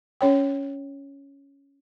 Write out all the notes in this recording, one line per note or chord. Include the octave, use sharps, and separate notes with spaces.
C#4 C#5 G5